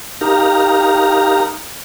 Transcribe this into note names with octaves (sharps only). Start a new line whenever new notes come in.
D#4 G4 A#4 F5 A#5